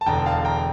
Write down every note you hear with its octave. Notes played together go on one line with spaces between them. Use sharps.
A5
E1 E2 D3 G5 A#5
F5 A5
G5 A#5